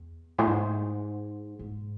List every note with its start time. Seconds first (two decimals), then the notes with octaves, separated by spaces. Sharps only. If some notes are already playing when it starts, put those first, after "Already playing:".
Already playing: E2
0.38 A2
0.47 G#2
1.59 G#2